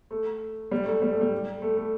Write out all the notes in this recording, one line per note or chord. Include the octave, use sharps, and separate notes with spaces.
A3
G3
A3
G3
A3
G3
A3
A3